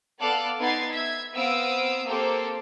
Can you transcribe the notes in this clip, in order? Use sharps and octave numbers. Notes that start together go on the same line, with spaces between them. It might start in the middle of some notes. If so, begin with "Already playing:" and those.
B3 A4 D5 F5 D6 F#6
B3 D#4 C6 G#6 A6 C7
E5 G#6
B3 C4 F5 D#6 E6 D7
A#3 C4 G4 A4 C5